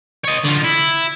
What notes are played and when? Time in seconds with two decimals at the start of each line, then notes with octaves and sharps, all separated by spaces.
0.24 C#5 D#5
0.44 D3 F4
0.64 E4